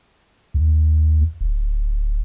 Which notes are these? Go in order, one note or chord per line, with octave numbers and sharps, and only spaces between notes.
D#2
D1